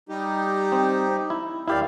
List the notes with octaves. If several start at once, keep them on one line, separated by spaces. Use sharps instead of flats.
G3 D#4 G4
C4
E4
D#2 D#3 E4 G4 D5 F5